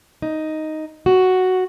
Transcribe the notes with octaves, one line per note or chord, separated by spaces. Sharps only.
D#4
F#4